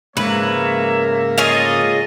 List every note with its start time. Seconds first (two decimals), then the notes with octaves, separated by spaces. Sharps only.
0.17 G#2 C#3 G#3 A#3 B4 C#5 E5 A#5
1.38 F4 G#4 A4 C#5 D#5